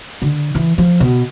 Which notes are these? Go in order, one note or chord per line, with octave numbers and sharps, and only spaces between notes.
D3
E3
F3
B2